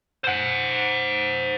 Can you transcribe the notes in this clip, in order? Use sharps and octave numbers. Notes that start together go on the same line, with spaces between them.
C5 F#5